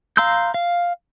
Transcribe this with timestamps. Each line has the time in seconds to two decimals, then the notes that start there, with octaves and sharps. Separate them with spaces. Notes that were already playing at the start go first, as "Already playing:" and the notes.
0.17 F5 A#5 C6 E6 G6
0.54 F5